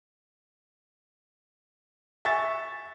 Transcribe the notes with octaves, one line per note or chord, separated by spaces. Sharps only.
E5 G#5 C#6 A6